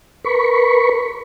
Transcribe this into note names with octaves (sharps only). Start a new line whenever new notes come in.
A#4 B4 B5 C#6